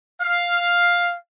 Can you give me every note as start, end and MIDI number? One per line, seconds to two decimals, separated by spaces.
0.21 1.14 77